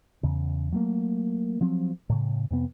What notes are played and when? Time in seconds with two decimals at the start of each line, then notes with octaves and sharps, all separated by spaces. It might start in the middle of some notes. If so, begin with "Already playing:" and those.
0.23 E2 C#3
0.72 F#3 A3 A#3
1.61 F3 F#3 C4
2.10 A2 C#3
2.51 F2 C3 B3